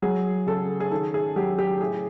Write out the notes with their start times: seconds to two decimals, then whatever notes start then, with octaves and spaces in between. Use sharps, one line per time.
0.02 F#3 G#4
0.47 C#3 A4
0.80 G#4
0.91 D#3 A4
1.14 G#4
1.36 F#3 G4
1.59 G4
1.80 A2 G#4